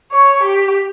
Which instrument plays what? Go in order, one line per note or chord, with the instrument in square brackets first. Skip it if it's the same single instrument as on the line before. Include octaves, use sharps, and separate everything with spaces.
[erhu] C#5
G4